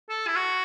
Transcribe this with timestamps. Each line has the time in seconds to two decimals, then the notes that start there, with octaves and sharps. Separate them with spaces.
0.09 A4
0.27 E4
0.36 F#4